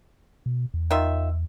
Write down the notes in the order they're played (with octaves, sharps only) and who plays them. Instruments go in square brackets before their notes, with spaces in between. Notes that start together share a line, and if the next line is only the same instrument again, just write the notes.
[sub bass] B2
E2
[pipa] D#3 F4 E5